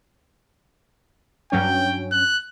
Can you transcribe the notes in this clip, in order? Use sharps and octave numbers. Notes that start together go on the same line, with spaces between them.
G2 F#3 C#4 G5
F#6